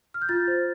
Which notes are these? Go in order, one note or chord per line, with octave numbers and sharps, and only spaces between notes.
F6
G6
F4 F6 A6
C5